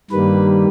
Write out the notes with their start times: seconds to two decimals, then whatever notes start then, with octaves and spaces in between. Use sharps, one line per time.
0.10 G2 D#3 G3 A#3 B4